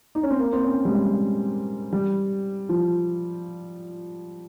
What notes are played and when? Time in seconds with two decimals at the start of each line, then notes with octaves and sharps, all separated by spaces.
0.15 D#4
0.23 C#4
0.31 C4
0.39 A#3
0.53 C4
0.64 C#4
0.85 G3
0.90 G#3
1.93 G3
2.69 F3